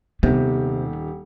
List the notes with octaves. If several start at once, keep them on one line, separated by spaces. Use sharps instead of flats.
D#1 C3 D#3 B3 G4